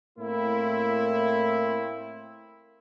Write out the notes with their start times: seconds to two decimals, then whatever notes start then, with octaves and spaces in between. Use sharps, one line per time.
0.17 A2 A#3 C4 E4